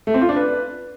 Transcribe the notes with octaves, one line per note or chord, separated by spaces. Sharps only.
A3
C4
F4
D4
B4